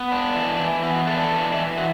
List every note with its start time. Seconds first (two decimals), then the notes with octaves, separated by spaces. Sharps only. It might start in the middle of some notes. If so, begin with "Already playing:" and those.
Already playing: B3
0.12 D4
0.36 E3
0.59 E3
0.83 B3 E4
0.95 F#4
1.07 D4 A4
1.19 A4
1.31 E3
1.54 E3
1.77 F#4